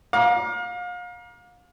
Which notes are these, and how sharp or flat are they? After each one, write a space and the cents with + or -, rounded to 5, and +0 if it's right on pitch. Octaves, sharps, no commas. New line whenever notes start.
F5 +35 A#5 +30 D6 -5